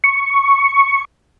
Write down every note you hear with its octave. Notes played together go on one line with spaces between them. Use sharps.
C#6